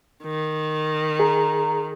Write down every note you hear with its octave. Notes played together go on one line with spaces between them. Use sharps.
D#3
G#4 A#5